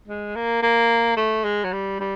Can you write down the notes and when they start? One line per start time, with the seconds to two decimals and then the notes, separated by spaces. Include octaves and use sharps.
0.08 G#3
0.36 A#3
0.62 A#3
1.17 A3
1.44 G#3
1.64 F#3
1.72 G3
2.00 G3